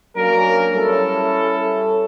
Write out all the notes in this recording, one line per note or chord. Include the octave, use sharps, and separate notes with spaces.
F#3 A#3 C#4 D4 A#4
G3 C#4 E4 A4